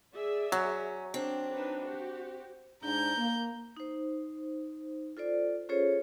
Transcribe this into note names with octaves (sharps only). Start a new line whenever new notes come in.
G#4 D5 E5
F#3 C#4
C4 D4
D4 D#4 B4
F#4 G4
G#2 D4 A#5 G6
A#3
D#4 C5
F4 A4 C5 D5
C#4 F4 G#4 A4 C5 C#5